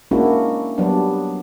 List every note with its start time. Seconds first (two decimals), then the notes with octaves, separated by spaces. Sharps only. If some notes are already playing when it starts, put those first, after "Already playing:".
0.11 G#3 A#3 C#4 D4 E4 F#4
0.78 F#3 G3 B3 D4